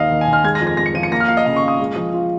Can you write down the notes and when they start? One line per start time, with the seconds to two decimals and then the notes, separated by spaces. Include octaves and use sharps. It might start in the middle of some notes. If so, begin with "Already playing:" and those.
Already playing: D#2 D#3 D#5 F5
0.10 D#3
0.21 G#5
0.28 D#3
0.33 F6
0.44 G#3 G#6
0.55 A#6
0.61 F2
0.67 A#6
0.77 G#3 A#6
0.86 C#7
0.94 F3 D#7
1.03 C#7
1.12 A#3 A#6
1.20 F6
1.28 F4 F5
1.37 D#5
1.46 C#3 F5
1.56 C#6
1.63 F4 D#6
1.80 G#3
1.96 F3
2.14 F4